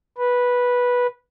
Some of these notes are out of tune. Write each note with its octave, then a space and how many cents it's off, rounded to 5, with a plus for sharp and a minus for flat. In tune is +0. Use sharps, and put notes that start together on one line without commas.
B4 -10